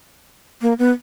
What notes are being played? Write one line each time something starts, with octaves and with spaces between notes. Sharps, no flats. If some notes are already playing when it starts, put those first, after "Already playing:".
A#3
B3